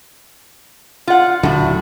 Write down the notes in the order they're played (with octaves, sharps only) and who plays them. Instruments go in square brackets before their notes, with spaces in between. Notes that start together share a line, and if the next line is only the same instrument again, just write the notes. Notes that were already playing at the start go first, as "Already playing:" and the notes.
[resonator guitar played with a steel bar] F4 F#5
[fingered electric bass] D#1 D3 F#3 [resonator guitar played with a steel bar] A2 F#4